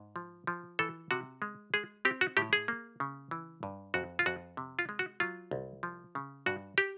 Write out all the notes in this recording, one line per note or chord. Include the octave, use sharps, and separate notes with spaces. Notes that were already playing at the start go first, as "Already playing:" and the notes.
Already playing: G#2
F3
F3
E3 A4
C3 F#4
G#3
G#3 G#4
C4 G4
F#4
A2 G4
G#4
A#3
C#3
E3
G2
F2 F#4
F4
F2 F#4
C3
F4
G#3
F#4
F#3 F4
C2
F3
C#3
G2 F#4
G4